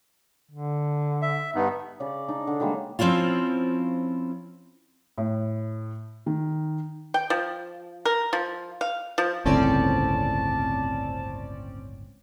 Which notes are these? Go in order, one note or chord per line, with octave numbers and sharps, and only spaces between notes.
D3
E5
G2 B3 D#4
C#3 D5
D4 D#4
D3
D#3 G3 G#3 A#3
F3 C4 C#4 E4 F4
A2
D#3
G5
F3
A#4
F3
F5
F3
G1 C#2 A2 C4 C#4 D5 A5